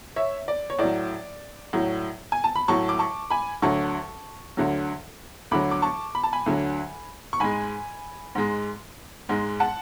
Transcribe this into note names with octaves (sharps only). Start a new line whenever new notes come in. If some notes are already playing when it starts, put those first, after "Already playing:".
C#5 E5
D5
C#5
A2 F#3 D5
A2 F#3
G#5
A5
B5
A2 F#3 A5 C#6
D6
A5 C#6
G#5 B5
D2 D3 F#3 A5 C#6
D2 D3 F#3
D2 D3 F#3 B5 D6
D6
A5 C#6
B5
A5
G#5 B5
D2 D3 F#3
C#6
G#2 G#3 G#5 B5
G#2 G#3
G#2 G#3
F#5 A5